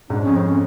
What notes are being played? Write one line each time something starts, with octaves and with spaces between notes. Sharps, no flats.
G#2 D4
F2 C#4
C4
C#4